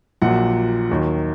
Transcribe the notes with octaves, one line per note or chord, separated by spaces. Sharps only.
A#1 A#2 F#3 F#5
D#2 D#3 F#3